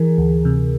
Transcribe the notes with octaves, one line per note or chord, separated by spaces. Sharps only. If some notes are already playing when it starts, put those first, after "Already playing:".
Already playing: E3 G#4 A#4
D2
C3